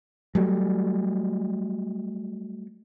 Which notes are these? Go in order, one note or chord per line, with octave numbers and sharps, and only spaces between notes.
F#3 G3 A3